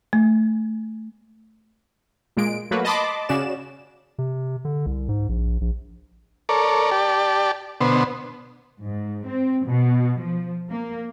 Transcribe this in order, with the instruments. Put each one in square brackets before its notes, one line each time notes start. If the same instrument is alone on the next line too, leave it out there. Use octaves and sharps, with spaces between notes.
[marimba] A3
[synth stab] A#2 G#3 D7
F#3 A3 A#3 F#4 B4
D#5 A5 B5 C6 D6
C#3 C#4 F#4 D5 E7
[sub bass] C3
D3
C2
G#2
A#1
A#1
[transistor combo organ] A4 A#4 C#5 D5
G4 D5 A5
B2 D3 B3 C5
[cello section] G#2
C4
B2
F3
A#3